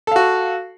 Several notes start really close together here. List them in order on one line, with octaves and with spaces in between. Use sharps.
A4 F5 F#4